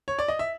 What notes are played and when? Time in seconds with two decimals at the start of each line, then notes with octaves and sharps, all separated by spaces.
0.08 C#5
0.19 D5
0.28 D#5
0.39 E5